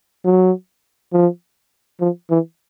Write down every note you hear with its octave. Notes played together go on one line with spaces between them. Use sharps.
F#3
F3
F3
E3